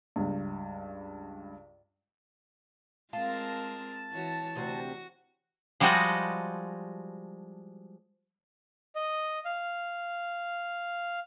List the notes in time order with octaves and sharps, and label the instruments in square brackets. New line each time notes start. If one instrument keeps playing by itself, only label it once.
[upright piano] C#2 G2
[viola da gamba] G#3 C4 A#4 [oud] F4 [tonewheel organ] A5
[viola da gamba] E3 F#4 C#5
[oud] D2 C3 C4 [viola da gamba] F#4
[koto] F3 G3 G#3 F#4 D#5 A5
[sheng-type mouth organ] D#5
F5